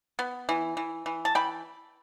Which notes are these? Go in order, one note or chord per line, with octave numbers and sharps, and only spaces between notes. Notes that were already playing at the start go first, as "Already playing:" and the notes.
B3
E3
E3
E3
A5
E3 G5 B5